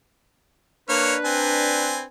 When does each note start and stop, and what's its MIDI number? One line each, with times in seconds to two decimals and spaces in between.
0.89 1.14 58
0.89 2.07 62
0.89 2.07 71
0.89 1.14 73
0.89 1.14 89
1.25 2.04 60
1.25 2.04 80